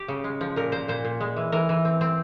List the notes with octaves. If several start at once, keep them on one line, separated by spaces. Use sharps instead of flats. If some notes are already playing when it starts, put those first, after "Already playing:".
Already playing: G4
C#3
G#3
F3
A#2 A#4
A#2 C5
A#2 C5
A#2
G#3
E3
E3 A#4
E3
C4
C4